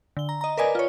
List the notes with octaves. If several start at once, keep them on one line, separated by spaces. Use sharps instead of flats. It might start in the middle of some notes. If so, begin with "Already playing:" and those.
D3 G7
A#5
D#5 A#5
A#4 B4 D5 D#5 G#5
F4 C#5